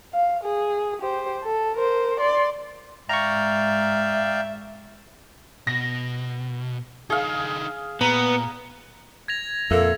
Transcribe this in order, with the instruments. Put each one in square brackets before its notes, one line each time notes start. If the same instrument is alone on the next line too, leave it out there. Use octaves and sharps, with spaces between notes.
[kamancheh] F5
G#4
G4 C5
A4
A#4 C5
D5 C6
[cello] G#2 [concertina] D5 F5 G5 [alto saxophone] E5 [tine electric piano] A#5 C#6
[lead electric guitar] B2 [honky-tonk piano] A#6
[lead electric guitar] D3 D#4 [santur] G#4 F5
[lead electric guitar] A#2 [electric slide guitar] B3 [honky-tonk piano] A#5
[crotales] G#6 A#6 F7
[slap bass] F2 [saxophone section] A#2 A#3 E5 [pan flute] A4